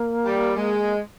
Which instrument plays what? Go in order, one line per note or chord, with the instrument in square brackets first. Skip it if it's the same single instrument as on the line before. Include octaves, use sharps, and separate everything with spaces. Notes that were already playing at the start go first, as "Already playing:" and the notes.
Already playing: [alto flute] A#3
[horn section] G3
G#3